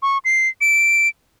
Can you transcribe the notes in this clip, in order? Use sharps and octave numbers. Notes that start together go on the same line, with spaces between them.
C#6
C7
D7